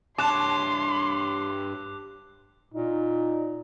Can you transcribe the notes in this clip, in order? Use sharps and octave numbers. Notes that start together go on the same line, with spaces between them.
G2 C#5 A5 C6 D6 F#6
A#2 D#4